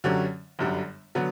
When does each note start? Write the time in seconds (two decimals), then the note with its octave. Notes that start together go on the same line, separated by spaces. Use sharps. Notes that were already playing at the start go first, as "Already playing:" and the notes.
0.04 F#2 D3 F#3 C#4 G4
0.59 G1 F#2 D3 G3
1.15 D3 F#3 B3